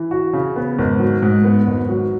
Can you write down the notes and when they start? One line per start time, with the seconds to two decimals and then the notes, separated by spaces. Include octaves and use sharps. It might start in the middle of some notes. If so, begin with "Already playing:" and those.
Already playing: E3
0.11 F#4
0.33 C#3
0.56 B3
0.78 G#1
1.00 F#3
1.22 G#2
1.44 B3
1.67 G#1
1.89 F#3